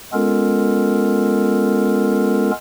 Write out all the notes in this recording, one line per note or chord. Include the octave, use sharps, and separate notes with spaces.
G#3 B3 C#4 F4 A4 A#4